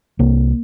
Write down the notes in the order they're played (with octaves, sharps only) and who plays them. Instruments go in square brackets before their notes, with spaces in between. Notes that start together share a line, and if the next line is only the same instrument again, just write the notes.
[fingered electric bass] C2 A#3